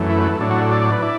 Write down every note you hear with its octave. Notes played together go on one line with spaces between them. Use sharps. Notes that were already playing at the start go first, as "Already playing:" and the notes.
Already playing: F#2 E3 A3
E4
B4
A4
A2 F#3 D4
F#4
A4
D5
D5
B4
E4 D5